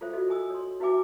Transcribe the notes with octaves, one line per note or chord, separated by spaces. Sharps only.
F4 A4 C5 E5
F#4 A4 D#5
A4 G#5 D#6 E6
C#5 C6
E4 F#4 B4 E5 G#5 D6